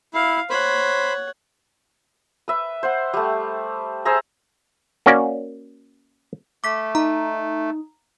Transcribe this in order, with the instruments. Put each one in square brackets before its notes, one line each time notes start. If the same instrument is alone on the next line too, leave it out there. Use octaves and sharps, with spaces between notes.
[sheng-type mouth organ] E4 [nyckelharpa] F5
[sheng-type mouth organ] C5 B5 [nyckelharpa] C#5 F#5
[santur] B4 E5
C5 F#5
G3 A3
G#4 C5 E5 A#5
[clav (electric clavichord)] A#3 C#4 F#4 D5
[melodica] A3 [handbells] D6 B6
[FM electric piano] D#4 [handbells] A#5